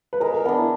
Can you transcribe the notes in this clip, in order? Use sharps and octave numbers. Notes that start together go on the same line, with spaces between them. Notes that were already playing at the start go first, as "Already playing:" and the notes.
B4
G#3 A#4
A#4
B3 D4 A#4
E4